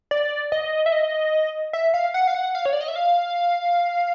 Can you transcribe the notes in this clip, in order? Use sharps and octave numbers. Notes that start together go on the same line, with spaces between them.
D5
D#5
E5
D#5
E5
F5
F#5
F5
F#5
F5
C#5
D5
D#5
E5
F5